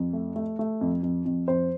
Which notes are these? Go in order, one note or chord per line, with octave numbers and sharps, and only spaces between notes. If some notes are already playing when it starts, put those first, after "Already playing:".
Already playing: F2
A3
A3
A3
F2
F2
F2
F2 C5